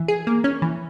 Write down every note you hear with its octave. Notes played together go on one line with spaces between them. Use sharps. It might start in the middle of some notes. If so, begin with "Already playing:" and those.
Already playing: E3
G#4
A#3
C#4
E3